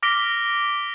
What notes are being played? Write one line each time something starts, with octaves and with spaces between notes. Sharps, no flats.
D6 F6 A#6 B6 D7 G7